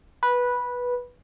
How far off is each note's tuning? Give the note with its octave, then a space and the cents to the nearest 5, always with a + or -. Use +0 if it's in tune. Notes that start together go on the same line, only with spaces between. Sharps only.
B4 -10